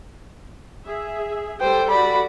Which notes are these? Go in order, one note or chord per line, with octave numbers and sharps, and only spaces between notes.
G#4 E5
G3 G4 A4 C5 G5
F#4 D5 B5